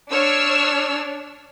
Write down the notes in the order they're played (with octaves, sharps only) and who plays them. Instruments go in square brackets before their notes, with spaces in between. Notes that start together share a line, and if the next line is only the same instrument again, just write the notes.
[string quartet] D4 [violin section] C#5 E6 F6